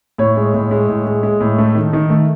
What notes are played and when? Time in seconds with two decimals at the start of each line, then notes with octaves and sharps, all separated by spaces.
0.18 A2 C#5
0.36 G#3
0.54 A2
0.71 G#3
0.88 A2
1.06 G#3
1.23 G#3
1.41 A2
1.58 A3
1.75 D#3
1.93 D#3
2.10 A3